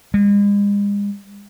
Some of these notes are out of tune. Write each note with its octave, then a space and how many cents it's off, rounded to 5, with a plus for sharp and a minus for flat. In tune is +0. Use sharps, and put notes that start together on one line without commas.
G#3 -40